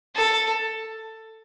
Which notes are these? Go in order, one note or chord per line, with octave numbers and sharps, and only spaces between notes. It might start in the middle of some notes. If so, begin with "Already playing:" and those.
A4